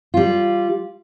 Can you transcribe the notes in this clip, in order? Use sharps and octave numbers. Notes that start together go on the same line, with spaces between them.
G3 F4